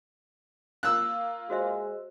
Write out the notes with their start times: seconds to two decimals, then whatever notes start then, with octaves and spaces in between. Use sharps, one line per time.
0.83 A#3 F4 E6 F#6
1.50 G#3 F#4 C5 E5